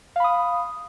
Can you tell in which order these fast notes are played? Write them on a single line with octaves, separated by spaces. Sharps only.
F5 B5 D#6